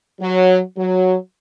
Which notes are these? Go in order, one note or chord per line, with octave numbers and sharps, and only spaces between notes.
F#3
F#3